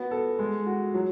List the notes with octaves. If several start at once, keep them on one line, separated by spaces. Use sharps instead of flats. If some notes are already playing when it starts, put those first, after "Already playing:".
Already playing: B3 F#4
A4
G#3
F#4
F#3